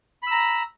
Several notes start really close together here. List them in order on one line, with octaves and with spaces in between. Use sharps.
B5 E6 A#5